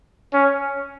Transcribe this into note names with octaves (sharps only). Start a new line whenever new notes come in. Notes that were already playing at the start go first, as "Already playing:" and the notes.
C#4